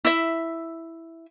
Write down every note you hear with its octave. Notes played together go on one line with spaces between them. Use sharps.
E4 E5